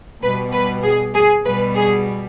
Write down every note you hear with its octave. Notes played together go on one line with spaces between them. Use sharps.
B2 G3 B4
B4
G#4
G#4
B2 G3 B4
G#4